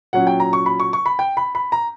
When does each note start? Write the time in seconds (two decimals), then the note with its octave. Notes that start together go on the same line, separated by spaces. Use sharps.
0.13 A#2 F#3 C#4 F#5
0.27 G5
0.40 A#5
0.53 C#6
0.66 B5
0.80 C#6
0.93 C#6
1.06 B5
1.19 G5
1.37 B5
1.55 B5
1.72 A#5